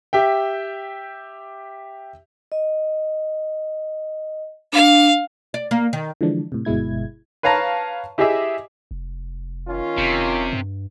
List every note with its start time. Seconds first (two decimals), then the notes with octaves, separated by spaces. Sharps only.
0.13 G4 E5 G5
2.52 D#5
4.73 D4 F5
5.54 D5
5.71 A#3
5.93 D#3
6.21 D3 E3 F3 G#3 D4
6.52 A2 C3
6.65 G1 B2 G#3 E4 G#6
7.43 B4 C#5 F5 A5 A#5
8.18 E4 G4 G#4 D#5 E5 D6
8.91 F1
9.67 D#3 C#4 F4
9.98 F1 C3
10.53 G2